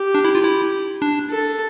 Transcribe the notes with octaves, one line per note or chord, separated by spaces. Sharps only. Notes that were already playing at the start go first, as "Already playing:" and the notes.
Already playing: G4
D4
E4
F4
E4
D4
A4